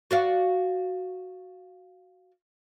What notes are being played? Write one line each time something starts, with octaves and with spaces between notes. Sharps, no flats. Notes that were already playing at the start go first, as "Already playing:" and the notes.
F#4 D5 F5